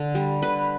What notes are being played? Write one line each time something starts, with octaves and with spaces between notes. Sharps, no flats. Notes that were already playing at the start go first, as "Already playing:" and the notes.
Already playing: D3
G3
D3 B4